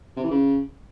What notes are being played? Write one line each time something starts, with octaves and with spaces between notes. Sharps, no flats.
C3
E3
C#3